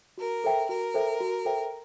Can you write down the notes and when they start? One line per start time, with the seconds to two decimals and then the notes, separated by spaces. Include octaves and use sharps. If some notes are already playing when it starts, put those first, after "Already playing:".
0.18 F#4 A#4
0.44 A4 C5 E5 G5
0.69 F#4 A#4
0.94 A4 C5 E5 G5
1.20 F#4
1.45 A4 C5 E5 G5